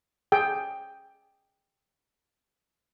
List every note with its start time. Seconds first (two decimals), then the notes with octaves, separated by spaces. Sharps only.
0.32 G#4 G5